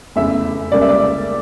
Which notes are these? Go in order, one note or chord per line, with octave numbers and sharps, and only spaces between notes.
F1 E2 C#3 E5
C#2 C#3 G3 A#3 D5
E5
D5